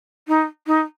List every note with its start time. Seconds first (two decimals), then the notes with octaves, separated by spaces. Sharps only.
0.28 D#4
0.67 D#4